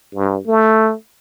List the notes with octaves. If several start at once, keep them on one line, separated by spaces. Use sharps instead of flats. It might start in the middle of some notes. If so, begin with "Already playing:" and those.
G2
A3